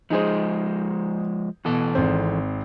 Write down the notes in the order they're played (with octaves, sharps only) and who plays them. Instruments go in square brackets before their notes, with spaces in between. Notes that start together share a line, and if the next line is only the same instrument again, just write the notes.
[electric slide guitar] F3 G#3 [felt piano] D#4 G#4 C5
[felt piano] B2 [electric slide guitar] E3 A4
[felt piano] G#1 C4